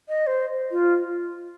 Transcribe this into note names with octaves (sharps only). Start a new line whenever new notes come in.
D#5
C5
F4